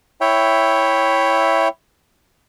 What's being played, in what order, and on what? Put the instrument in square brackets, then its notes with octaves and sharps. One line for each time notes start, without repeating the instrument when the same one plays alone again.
[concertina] E4 C#5 E5 G5